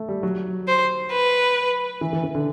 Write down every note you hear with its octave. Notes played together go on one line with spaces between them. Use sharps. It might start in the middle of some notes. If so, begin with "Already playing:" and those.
Already playing: A3
G3
F#3
C5
B4
E3
E3
E3
D3